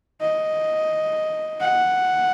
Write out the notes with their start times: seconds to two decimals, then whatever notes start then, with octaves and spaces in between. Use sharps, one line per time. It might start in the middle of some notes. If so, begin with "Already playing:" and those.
0.21 D#5
1.61 F#5